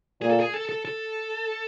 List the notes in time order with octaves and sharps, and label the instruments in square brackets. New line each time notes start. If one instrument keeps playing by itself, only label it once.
[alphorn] A#2 [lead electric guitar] G#4
[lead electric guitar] A4
G#4
A4
A4
A4